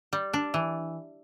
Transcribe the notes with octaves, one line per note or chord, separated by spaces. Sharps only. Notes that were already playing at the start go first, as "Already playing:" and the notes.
G3
D4
E3